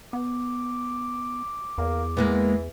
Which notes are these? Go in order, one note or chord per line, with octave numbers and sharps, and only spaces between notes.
B3 D6
E2 A#3
E3 G#3 A#3 B3